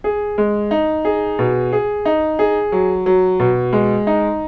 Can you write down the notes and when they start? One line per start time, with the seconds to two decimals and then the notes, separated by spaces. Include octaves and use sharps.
0.04 G#4
0.38 G#3
0.71 D#4
1.05 G#4
1.39 B2
1.73 G#4
2.05 D#4
2.39 G#4
2.72 F#3
3.06 F#3
3.40 B2
3.73 G#3
4.07 D#4